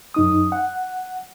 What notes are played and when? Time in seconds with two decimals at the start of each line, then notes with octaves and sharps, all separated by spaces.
0.14 F#2 D#4 D#6
0.52 F#5